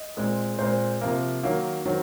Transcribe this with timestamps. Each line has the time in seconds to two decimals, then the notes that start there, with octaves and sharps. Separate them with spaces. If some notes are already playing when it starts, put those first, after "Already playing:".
Already playing: D#5
0.17 A#2 G#3 C4
0.59 A#2 G#3 C4 C5
1.01 C3 F3 A#3 A#4
1.43 D#3 F#3 A#3
1.85 D#3 F#3 C4